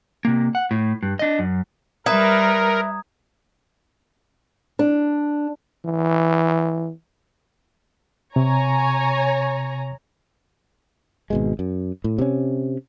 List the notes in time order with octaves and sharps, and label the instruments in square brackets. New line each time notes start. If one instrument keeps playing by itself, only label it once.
[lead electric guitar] C3 A#3
F#5
A2
G2
D4 D#5
F#2
[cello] G3 B4 [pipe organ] A#4 [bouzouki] E5 [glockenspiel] A#5 D#6 G#6
[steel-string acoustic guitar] D4
[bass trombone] E3
[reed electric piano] C3 [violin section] C#5 G#5 A#5
[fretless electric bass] G#1 B2 G#3
F#2
A2
C3 C#4